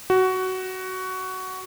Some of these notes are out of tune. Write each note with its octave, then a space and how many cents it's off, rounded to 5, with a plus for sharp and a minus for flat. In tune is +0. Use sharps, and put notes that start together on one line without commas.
F#4 +15